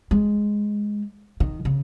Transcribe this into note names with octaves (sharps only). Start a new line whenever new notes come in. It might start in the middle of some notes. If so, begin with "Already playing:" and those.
G#3
D#3
C#3